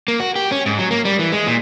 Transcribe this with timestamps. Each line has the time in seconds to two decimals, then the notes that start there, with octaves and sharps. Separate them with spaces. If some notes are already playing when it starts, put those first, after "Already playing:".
0.08 A#3
0.20 F#4
0.36 G4
0.52 C#4
0.66 G#2
0.79 F#3
0.91 A#3
1.05 G3
1.19 E3
1.32 G#3
1.47 A#2